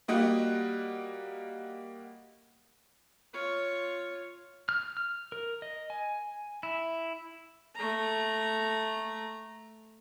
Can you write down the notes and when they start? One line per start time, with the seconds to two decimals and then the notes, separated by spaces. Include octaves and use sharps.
0.08 G3 A#3 F#4 G4 D#5 F#5
3.33 F4 C#5
4.69 F6
4.97 F6
5.32 A#4
5.62 D#5
5.90 G#5
6.63 E4
7.75 A3 A#5